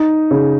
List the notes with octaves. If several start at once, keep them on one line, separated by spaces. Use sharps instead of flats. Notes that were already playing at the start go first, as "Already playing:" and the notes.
Already playing: D#4
C#3